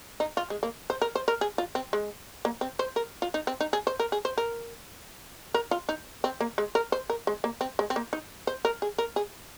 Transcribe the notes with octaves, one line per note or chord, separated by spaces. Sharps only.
D#4
F4
G#3
A#3
C5
A#4
C5
A#4
G#4
F4
C4
G#3
A#3
C4
C5
A#4
F4
D#4
C4
D#4
G#4
C5
A#4
G#4
C5
A#4
A#4
F4
D#4
C4
A#3
G#3
A#4
C5
A#4
G#3
A#3
C4
G#3
C4
A#3
D#4
C5
A#4
G#4
A#4
G#4